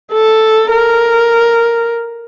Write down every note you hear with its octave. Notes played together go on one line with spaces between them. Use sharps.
A4
A#4